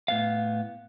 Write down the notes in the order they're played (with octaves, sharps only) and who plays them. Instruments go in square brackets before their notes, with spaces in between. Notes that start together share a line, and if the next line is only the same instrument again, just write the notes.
[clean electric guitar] A2 B3 F5